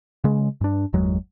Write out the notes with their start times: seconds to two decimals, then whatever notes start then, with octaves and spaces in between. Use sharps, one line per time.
0.24 C#3 G#3
0.61 G2 D4
0.93 G1 E2 F#3 G#3